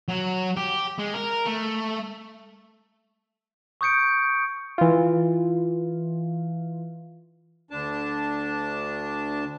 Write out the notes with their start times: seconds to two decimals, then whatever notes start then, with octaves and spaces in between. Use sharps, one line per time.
0.08 F#3
0.57 G4
0.99 G#3
1.14 A#4
1.46 A3
3.81 C#6 D#6 G6 C#7 D7
4.78 E3 F4
7.71 D2 D4 A5